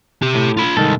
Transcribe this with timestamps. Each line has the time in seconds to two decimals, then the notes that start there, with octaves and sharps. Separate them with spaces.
0.22 G4 E5
0.35 A2
0.57 F4 B5
0.77 C2 G#2 D#3 A4